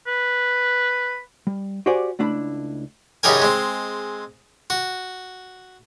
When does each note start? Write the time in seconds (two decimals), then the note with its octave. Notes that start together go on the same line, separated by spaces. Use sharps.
0.07 B4
1.47 G3
1.86 F#4 G4 C5 D5 F#5 G#5
2.19 C#2 A3 D4 E4 B5
3.23 F#2 C#3 D#4 G4 A#4 G#5
3.42 G#3 C4
4.70 F#4